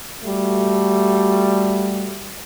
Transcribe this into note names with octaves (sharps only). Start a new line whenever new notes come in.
G3 A3 F#4